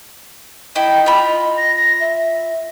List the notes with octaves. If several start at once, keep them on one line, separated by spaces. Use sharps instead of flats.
E4 D#5 G5
F4 B5
A#6
A#6
E5